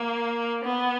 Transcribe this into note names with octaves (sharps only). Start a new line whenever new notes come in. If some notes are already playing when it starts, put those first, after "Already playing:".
Already playing: A#3
B3